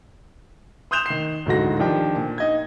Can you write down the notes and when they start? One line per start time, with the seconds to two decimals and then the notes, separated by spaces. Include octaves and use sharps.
0.91 C6 D#6 F#6 G6 E7 F7
1.06 D#3 C7
1.46 D1 G#2 D3 F#4 A#6
1.79 D#3 F3 D4 G4 G5
2.15 A#2
2.38 D#4 D#5 G#6